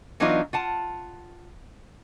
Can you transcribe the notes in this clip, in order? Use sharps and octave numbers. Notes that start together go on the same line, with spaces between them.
E3 F#3 B3 D4 D#4 F4
F4 F#5 A5